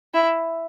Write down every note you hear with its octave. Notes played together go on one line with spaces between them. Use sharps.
E4